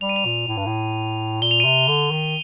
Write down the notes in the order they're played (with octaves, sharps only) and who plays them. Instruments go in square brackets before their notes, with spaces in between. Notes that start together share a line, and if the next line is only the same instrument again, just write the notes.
[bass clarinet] G3 [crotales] F7
[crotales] D#7
F7
[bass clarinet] A#2
A2
G2
A2
[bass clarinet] A#2 [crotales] G7
[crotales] F7
D#7
[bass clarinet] C3 [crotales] F7
[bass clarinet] D3
D#3